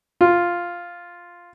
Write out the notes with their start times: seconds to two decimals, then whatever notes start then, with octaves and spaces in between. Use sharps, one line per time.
0.21 F4